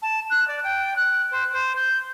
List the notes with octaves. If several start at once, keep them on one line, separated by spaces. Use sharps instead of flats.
A5
F#6
D5
G5
F#6
C5
C5
G6